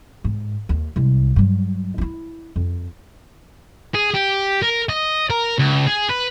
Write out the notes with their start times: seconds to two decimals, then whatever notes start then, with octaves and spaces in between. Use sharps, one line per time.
0.24 G#2
0.69 D#2
0.96 C2 G#3
1.36 G2 F#3
1.98 D#4 E4
2.56 F2
3.95 G#4
4.15 G4
4.63 A#4
4.89 D#5
5.30 A#4
5.58 C#2
5.87 G#4
6.09 B4